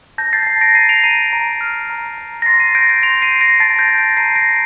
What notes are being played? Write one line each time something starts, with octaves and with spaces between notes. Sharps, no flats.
A5 G6 A#6
A6 C7
A5
A#6 D7
A#5 C7 D#7
D7 F7
A#5 C7 D#7
A#5
F6
A#5
A#5
A#6
C6 A6 C7
C7 D#7
G6 A#6 D7
A#6 D7
C6 D7 F7
C7 D#7
G6
A#6 D7
A5 A6 C7
G6 A#6
A5
A#6 D7
A#5 C7 D#7
A#6 D7
A#5